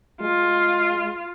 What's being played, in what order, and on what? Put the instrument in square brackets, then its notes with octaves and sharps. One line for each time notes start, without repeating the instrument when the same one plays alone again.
[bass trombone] G#3 [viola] F4